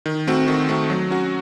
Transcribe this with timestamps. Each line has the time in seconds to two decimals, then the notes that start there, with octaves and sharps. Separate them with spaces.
0.06 D#3
0.27 A3 C4 F#4
0.48 D#3
0.69 A3 C4 F#4
0.90 F#3
1.10 C#4 F#4